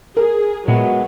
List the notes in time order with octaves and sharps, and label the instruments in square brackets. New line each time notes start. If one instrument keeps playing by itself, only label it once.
[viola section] G#4 [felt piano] A#4
[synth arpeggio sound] A#2 [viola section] F#3 [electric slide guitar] G#3 B3